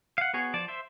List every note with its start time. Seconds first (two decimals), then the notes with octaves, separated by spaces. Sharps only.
0.18 F5 F#5
0.34 B3 F#4 G#4 C#5
0.54 F3 D5 A5
0.68 C5 E5